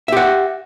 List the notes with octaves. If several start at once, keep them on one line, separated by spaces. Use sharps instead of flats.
G4 E5 F#5